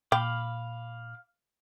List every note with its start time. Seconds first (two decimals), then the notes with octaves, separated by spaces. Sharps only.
0.12 A#2 F5 G5 B5 D6